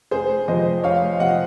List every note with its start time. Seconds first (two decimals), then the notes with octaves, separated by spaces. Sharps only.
0.11 F1 G#4 C5
0.48 F2 C3 F3 C5 D#5
0.83 F1 C#5 F5
1.19 C3 F3 D#5 F#5